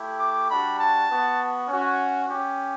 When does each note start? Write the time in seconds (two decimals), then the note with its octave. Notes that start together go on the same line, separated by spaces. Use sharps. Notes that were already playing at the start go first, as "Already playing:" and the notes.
Already playing: A3 E4 G4
0.20 D6
0.50 G3 D4 F#4 B5
0.79 A5
1.09 B3 F#4
1.68 C#4 F#4
2.27 C#4 G4